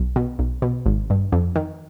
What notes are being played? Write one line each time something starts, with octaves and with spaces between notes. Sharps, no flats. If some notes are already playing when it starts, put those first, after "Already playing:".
Already playing: B1
B2
B1
B2
G#1
G2
F2
D#3